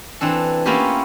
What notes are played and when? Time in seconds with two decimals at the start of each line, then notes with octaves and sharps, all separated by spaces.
0.21 E3 C4 D4 A4
0.66 A#3 B3 C#4 E4 F4 G4